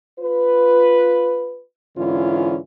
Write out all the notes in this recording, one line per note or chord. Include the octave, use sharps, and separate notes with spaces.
F4 B4
G#2 D3 E3 C#4 E4 F4